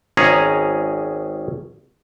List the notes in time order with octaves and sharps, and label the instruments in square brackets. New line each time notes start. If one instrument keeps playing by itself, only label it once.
[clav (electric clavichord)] G#1 C#4 G#4 A#5